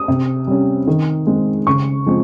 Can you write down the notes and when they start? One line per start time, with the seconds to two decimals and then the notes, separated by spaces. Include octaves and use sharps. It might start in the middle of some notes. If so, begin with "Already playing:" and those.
Already playing: D#6
0.08 C3
0.47 G3 C#4
0.87 D#3
1.27 G#3 C4
1.67 C#3 C#6
2.06 F3 G#3 C4